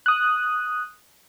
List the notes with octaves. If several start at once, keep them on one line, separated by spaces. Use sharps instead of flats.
D#6 F#6